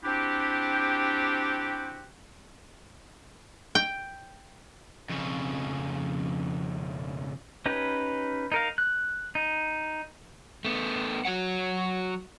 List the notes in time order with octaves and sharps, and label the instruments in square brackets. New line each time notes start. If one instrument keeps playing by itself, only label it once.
[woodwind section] C4 D4 E4 F#4 G4
[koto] G5
[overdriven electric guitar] F2 C#3
[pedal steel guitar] C#4 D#4 G4 B4
D#4 A#4 F5
F#6
D#4
[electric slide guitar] A3 B3
F#3 F#4 C#5 F#5